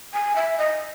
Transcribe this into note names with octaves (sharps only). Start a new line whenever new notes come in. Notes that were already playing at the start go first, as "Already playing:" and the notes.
G#5
E5
D#5